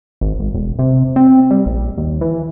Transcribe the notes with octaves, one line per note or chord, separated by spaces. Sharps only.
G#1
G#1
E1
C3
C4
G3
A#1
D#2
E3